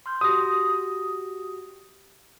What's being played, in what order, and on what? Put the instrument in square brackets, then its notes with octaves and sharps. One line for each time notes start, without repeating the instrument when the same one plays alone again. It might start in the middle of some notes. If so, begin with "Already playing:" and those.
[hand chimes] C6 F6 G6
[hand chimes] F#4 G4 A#6 [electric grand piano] D#6